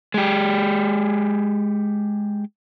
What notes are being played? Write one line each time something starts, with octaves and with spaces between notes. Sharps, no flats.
G#3 G4